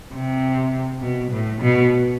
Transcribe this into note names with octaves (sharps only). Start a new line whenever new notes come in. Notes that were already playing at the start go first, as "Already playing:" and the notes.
C3
B2
A2
B2